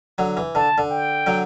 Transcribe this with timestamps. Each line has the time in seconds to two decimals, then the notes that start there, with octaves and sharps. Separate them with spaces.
0.18 D3 F#3
0.37 E3
0.55 D3 A5
0.78 D3
0.91 G5
1.26 D3 F#3